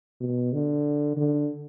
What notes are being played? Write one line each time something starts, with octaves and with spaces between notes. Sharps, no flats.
B2
D3
D3